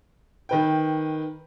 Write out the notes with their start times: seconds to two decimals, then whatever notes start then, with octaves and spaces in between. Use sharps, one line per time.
0.49 D#3 B4 G5